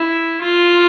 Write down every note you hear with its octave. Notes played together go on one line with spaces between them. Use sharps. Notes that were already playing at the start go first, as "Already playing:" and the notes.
Already playing: E4
F4